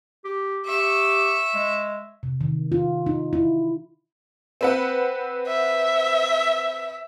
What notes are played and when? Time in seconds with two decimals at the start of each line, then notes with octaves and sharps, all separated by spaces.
0.25 G4
0.66 G4 E5 C#6
1.55 G#3
2.23 C3
2.41 D#3
2.72 F4
3.06 D#4
3.33 E4
4.61 C4 B4 F#5
5.48 E5